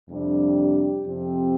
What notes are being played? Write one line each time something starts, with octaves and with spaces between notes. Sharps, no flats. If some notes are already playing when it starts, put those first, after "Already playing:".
F2 C3 G3 D4
G4
F2 C3 F3 C4 G4